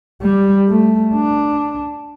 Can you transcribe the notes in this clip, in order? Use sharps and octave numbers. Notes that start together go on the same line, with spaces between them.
G3
A3
D4